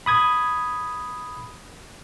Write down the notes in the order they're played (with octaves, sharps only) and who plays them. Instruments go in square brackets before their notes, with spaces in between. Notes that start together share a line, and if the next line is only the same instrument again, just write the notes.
[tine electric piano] B5 D#6 G#6